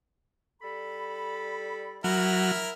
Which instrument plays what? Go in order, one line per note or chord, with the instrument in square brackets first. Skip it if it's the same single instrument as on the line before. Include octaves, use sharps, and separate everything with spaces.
[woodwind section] G3 A4 B5
[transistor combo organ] F#3 [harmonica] E4 A#4